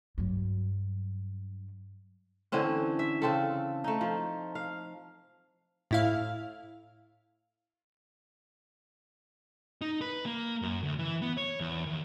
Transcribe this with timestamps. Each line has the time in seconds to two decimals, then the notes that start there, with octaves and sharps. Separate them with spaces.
0.18 G2 F#3
2.52 D3 E3 C4 C#4
2.99 E5
3.22 C#3 C4 A4
3.84 A3 D#4
4.01 F3
4.55 F5
5.91 A2 E4 F5
9.82 D#4
10.01 B4
10.26 A#3
10.62 F#2
10.83 D2
10.99 E3
11.22 B3
11.37 C#5
11.60 E2
11.86 D#2